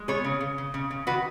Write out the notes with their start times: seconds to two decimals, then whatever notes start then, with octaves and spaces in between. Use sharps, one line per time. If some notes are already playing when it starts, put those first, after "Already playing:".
Already playing: G#3
0.08 B3 G#4 C#5
0.24 C#3
0.40 C#3
0.58 C#3
0.74 C#3
0.91 C#3
1.07 D#3 F#4 B4